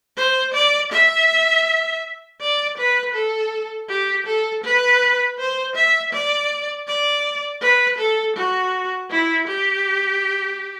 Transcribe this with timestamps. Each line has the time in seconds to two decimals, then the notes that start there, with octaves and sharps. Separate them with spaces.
0.17 C5
0.54 D5
0.92 E5
2.41 D5
2.77 B4
3.15 A4
3.89 G4
4.26 A4
4.64 B4
5.38 C5
5.75 E5
6.13 D5
6.87 D5
7.61 B4
7.98 A4
8.36 F#4
9.10 E4
9.48 G4